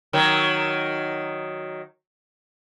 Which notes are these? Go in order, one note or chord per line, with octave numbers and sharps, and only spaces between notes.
D#3 F#3